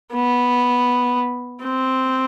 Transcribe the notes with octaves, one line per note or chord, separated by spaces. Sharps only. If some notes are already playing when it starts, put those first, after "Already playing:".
B3
C4